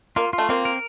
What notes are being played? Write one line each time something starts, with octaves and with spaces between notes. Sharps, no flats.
A#3 F4
F4
A3
A#3 C4
A#4